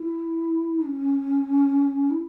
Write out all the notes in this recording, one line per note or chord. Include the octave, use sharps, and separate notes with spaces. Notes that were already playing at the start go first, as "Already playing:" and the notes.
Already playing: E4
C#4
E4